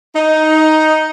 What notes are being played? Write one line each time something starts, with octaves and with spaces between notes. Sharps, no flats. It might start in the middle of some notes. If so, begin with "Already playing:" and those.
D#4